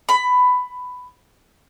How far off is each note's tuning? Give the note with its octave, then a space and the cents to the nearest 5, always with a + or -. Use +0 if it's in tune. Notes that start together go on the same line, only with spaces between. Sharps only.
B5 +15